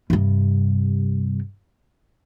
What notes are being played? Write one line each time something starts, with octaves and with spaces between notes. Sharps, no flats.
G2 C3